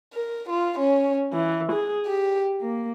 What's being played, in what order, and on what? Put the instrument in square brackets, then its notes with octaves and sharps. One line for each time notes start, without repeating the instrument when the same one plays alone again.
[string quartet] A#4
F4
C#4
E3
G#4
G4
A#3